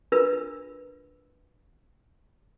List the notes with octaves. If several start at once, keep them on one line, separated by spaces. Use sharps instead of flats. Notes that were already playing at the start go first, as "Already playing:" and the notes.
D4 F4 A#4 B4 E6